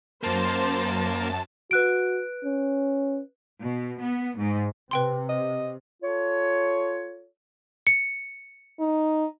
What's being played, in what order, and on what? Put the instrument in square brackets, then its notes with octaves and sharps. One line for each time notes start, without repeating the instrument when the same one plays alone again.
[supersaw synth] F#2 A5 [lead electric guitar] A#3 [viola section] C5
[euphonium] F#4 [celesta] B4 F#6 D7
[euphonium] C#4
[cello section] B2
B3
G#2
[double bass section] C3 [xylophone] B4 G5 C6
[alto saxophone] D#5
[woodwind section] F4 A4 C#5
[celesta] C#7
[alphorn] D#4